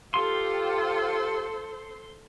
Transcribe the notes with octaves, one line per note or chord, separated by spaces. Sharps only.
F4 G4 A4 C5 C6